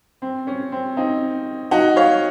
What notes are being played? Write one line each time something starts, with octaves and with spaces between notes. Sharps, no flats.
C4
C#4
C4
C4 D#4
D#4 F#4
C#5 F5